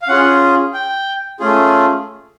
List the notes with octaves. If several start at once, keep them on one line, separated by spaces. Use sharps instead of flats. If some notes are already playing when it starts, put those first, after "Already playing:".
F5
C#4 F4 G#4 F#5
G5
A3 C#4 F4 G#4